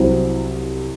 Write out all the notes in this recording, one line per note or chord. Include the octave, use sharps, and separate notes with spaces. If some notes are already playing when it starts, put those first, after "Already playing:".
Already playing: C2 C3 F#3 C4 E4